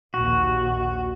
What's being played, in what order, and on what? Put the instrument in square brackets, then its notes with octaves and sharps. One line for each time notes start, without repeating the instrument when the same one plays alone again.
[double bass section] A#1 D#2 A#2 [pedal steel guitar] F#4